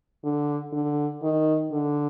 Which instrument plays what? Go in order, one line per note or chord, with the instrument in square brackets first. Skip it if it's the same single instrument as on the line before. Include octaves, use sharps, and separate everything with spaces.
[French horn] D3
D3
D#3
D3